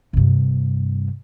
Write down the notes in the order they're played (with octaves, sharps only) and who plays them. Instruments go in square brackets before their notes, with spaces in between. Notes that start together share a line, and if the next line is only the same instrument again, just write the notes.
[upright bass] G2 C3